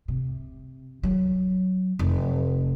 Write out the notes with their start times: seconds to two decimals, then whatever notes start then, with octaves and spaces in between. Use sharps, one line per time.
0.08 C3
1.03 F#3
1.99 F1